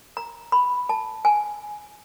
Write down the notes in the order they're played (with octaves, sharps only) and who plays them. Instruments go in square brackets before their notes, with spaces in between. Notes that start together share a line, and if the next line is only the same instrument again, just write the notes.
[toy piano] A#5
B5
A5
G#5